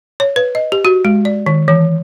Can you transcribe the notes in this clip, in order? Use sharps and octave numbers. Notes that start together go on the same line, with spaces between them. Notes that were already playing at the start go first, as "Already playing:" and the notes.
C#5
B4
D#5
G4
F#4
G#3
D5
D#3
E3